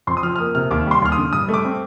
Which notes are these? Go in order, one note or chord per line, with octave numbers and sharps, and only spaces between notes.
F2 C6
D#6
F3 F6
F6
A#3 D#6
C3 F6
D#2 D6
G3 C6
D#2 F6
D#6
D3
G2 D#6
A3
D6
C4